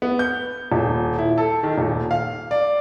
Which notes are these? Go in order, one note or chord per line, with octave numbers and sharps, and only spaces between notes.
B3
G6
D#1
E4
A4
D#3
D#1
F5
D5